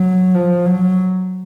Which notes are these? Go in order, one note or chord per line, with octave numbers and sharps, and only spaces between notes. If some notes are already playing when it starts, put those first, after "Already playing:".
Already playing: F#3
F3
F#3